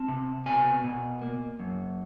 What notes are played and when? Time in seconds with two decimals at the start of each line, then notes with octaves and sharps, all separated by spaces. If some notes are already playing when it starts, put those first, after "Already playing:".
Already playing: C4 A5
0.08 C3
0.46 B2 G#5
0.84 B2
1.22 A#3
1.59 F#2